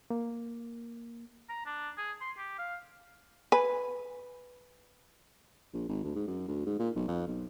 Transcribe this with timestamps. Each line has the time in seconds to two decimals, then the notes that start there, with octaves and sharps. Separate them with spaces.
0.10 A#3
1.49 A#5
1.66 D4
1.97 G#4
2.21 C6
2.37 G4
2.58 F5
3.52 B4 G#5
5.74 A#1
5.89 G#1
6.04 D2
6.16 G#2
6.28 F#2
6.48 D2
6.66 G#2
6.79 A#2
6.96 B1
7.08 F2
7.27 B1